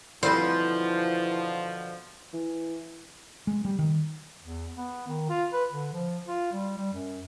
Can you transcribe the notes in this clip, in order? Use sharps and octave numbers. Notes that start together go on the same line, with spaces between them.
B2 D3 E3 F3 G3 C4 B4 C5
E3
G#3
G3
D#3
E2
B3
D#3
F4
B4
D3
F3
F4
G3
G3
F#2